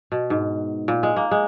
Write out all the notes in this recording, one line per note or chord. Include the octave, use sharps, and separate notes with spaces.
B2
G#2
A#2
G#3
A#3
G#3